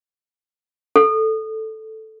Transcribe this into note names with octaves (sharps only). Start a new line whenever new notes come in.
A4